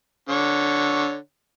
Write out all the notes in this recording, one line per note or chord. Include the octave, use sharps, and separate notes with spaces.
D3 C#5